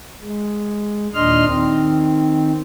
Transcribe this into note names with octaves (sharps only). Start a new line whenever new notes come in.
G#3
D#2 A#2 D4 D#5 C6 F6
D#3 C4